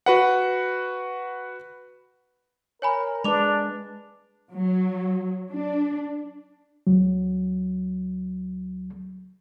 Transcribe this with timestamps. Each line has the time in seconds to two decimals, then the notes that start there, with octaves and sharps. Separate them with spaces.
0.06 F#4 B4 F#5
2.82 A#4 C#5 G#5 B5
3.24 G#3 D4 B4 D6 F7
4.55 F#3
5.51 D4
6.87 C#2 F#3